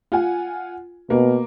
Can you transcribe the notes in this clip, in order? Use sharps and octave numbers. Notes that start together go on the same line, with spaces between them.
F4 F#5 G#5
B2 A#3